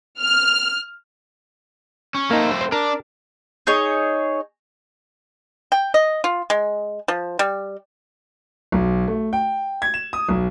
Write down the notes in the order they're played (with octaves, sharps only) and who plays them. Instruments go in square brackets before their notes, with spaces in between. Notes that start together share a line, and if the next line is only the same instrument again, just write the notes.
[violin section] F6
[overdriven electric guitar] C#4
[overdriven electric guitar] A3 C4 [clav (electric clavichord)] A#3 D#4
[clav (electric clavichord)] C5
[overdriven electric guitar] D4 [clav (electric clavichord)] A#4
[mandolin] D#4 G#4 C#5
[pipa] G5
D#5
F4
G#3
F3
G3
[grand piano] B1
A3
G5
G#6
E7
D#6
B1